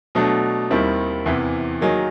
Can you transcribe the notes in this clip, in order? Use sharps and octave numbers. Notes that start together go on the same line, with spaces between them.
B2 F#3 A3 D4
D#2 D#3 G3 C4 E4
E2 C3 E3
D#3 F#3 A#3 D#4 G#4